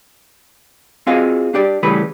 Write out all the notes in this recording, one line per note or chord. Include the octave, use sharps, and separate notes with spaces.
C4 F4 F#4 G#4 D#5 F5
D4 G4 D5
C#3 E3 G3 A3 B4 B5